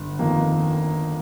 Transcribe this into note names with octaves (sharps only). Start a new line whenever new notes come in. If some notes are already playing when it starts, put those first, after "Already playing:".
Already playing: G1
F2 D#3 A#3